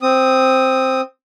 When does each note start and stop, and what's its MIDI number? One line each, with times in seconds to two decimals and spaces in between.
0.02 1.01 60
0.02 1.01 87